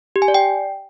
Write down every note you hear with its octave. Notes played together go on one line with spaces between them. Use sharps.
G4
G#5
D5
G5